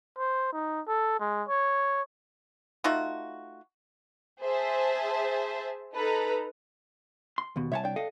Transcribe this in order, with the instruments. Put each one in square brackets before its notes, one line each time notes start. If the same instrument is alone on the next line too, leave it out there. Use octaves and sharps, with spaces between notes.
[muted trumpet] C5
D#4
A4
G#3
C#5
[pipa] A3 D#4 F4 F#4
[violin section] G#4 C5 E5 A5
D#4 A4 B4 A#5
[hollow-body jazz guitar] C6
D#2 B2
[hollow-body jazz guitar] C2 C#5 A5 [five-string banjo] E5 F#5 G#5
[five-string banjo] D4 G5
[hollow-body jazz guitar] A4 D#5 F5